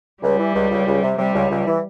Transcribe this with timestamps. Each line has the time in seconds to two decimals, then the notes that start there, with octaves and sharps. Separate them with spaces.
0.23 C#2 G3
0.39 E3
0.55 C#2
0.70 C#2
0.86 C#2
1.02 C3
1.17 C3 G3
1.34 C#2
1.50 C#2
1.66 E3